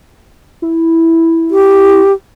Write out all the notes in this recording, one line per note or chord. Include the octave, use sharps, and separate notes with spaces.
E4
G4